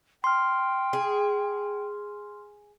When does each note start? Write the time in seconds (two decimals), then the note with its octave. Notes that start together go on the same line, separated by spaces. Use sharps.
0.24 G5 C6 F6
0.93 G#4